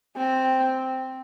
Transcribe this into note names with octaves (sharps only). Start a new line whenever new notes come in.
C4